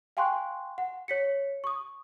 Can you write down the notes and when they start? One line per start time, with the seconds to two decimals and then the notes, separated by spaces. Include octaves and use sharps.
0.17 F5 G5 G#5 C6 C#6 F#6
0.78 F#5
1.08 C#5 B6 C#7
1.64 C#6 D#6